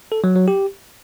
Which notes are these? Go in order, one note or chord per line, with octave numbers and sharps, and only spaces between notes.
A4
F#3
F#3
G4